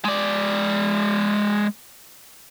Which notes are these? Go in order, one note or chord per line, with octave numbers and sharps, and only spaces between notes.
G#3 D5